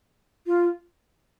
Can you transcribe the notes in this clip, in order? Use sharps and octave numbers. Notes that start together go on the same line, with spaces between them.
F4